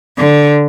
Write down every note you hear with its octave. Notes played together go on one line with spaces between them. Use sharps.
D3